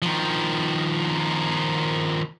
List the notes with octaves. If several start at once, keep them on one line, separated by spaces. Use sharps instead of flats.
D#3 F3